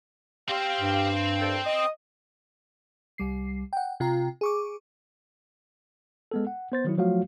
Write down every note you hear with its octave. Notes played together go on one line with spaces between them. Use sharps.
C4 G4 C5 F5
G2
C2 A4 G5
D#5 D#6
C2 G3 C7
F#5 G5
C3 F4 G5 A#5
G#4 C#6 D6
G#3 B3 A4
F#5
B3 C5 A6
D#3 F#3 E4
F3 F#3 A3 F4 F#4 F5